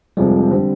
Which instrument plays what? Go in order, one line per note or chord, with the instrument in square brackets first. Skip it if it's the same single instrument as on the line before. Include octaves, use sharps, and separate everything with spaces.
[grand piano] F1 F2 C3 F3 G#3 [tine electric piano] G3
[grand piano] D3 G3 C4